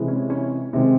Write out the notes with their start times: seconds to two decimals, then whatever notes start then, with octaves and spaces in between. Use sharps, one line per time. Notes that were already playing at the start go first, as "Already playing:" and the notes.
Already playing: C3 E3 G#3
0.08 C#4
0.30 C#4
0.73 C3 D#3 G#3 C4